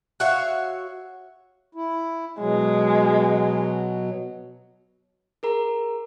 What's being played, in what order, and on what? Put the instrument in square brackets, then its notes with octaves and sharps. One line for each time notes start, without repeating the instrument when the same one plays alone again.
[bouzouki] F#4 C#5 E5 F5
[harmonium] E4
[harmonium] B2 F#3 [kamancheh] G#3
[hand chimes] G#4 A#4 A#5